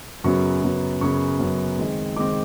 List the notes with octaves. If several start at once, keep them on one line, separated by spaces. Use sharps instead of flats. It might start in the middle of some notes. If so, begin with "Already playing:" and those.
F#2 C#3 F#3 B3 C#6
F#2 C#3 F#3 B3
F#2 C#3 F#3 B3 C#6
F#2 C#3 F#3 B3
D#3 G#3 C4
D#3 G#3 C4 D6